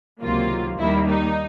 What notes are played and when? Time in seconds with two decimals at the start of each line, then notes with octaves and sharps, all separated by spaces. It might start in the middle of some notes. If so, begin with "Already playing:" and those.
0.21 C#2 C3 D#3 F#3 A#3 F4
0.78 D#2 D#3 G3 A#3 E4
1.08 D#4